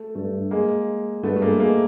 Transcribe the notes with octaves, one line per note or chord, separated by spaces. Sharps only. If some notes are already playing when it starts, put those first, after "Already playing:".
Already playing: A3
G2 A3
G#3 A#3
G2 A3 B3
A3
G#3 A#3
G#3 A#3